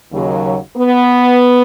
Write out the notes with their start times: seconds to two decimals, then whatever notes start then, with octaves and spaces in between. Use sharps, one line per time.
0.12 D#2 C#3 F#3
0.74 B3